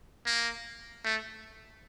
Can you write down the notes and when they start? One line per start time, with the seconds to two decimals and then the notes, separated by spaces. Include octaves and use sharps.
0.26 A#3
1.04 A3